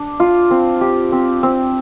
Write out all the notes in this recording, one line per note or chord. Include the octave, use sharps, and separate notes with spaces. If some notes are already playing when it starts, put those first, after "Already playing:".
Already playing: D4
F4
C4
G4
C4
C4